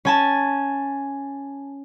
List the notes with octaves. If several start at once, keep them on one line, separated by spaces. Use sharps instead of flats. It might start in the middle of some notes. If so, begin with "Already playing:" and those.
C#4 G#5 A5